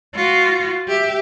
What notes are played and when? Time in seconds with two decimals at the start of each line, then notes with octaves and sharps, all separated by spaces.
0.15 F4 F#4
0.88 G4 E5